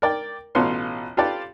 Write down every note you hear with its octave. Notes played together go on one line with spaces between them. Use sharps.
A#4 D5 G5
A1 B2 B3 F4 C#5 C6
F4 G4 A4 B4 D5